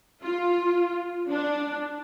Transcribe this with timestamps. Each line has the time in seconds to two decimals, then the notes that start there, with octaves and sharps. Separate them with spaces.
0.22 F4
1.28 D4